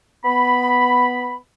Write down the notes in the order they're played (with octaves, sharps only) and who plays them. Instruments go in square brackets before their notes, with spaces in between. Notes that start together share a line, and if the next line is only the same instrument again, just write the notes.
[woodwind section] B3 B5